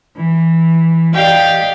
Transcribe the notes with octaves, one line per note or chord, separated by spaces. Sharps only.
E3
G4 D5 D#5 F5 G5